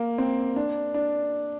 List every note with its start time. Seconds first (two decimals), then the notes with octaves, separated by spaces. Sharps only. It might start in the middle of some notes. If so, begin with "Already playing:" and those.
Already playing: A#3
0.18 C4
0.56 D4
0.94 D4